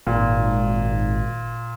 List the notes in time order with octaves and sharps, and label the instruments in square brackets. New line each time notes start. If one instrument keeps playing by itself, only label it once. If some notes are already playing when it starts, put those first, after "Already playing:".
[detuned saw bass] G#1 [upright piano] A#2